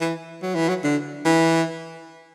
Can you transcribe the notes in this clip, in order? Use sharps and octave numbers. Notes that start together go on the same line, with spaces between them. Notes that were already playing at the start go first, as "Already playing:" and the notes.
E3
F#3
E3
F#3
D3
E3